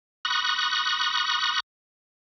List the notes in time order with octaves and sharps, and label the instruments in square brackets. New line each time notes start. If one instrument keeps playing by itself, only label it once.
[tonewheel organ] B5 C#6 D#6 F#6 A#6